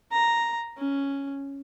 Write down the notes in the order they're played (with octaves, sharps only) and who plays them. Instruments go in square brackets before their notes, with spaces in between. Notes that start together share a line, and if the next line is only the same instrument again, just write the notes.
[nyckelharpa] A#5
C#4